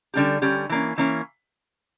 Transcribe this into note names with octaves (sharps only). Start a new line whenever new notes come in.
D3 G3 C#4 G4
D3 G3 C#4 G4
E3 A#3 C#4
E3 A#3 C#4